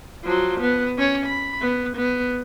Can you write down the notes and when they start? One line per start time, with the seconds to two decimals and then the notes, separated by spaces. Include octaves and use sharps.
0.24 F3 F#3
0.60 B3
0.98 C#4 C#5
1.26 B5
1.62 B3
1.96 B3